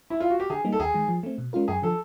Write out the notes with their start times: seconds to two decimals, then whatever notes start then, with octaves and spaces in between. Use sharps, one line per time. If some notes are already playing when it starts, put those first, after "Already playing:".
0.10 E4
0.20 F4
0.30 F#4
0.40 G4
0.50 D3 G#4
0.65 G3 A#3 D#4
0.72 A4
0.80 D#2 G#4
0.94 D#3 G#3
1.08 F3
1.23 A3 C4
1.38 B2
1.53 G#3 C#4 F4 A#4
1.68 F#2 G#4
1.82 D3 F3 A4